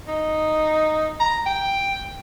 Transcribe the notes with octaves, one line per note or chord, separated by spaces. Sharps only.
D#4
A#5
G5